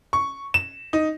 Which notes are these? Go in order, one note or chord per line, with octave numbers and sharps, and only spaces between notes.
C#6
E7
D#4